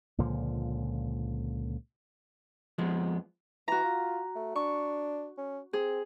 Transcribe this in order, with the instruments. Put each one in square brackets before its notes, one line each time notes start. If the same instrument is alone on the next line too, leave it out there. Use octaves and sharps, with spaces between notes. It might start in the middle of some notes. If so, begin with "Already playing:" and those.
[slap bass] C#2 A#2 D3 F3
[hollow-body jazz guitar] F2 F3 G#3 B3
[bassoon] E3 [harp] F#4 A#5
[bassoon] F4
A3
[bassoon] D4 [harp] C#6
[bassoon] C#4
[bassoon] C4 [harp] G#4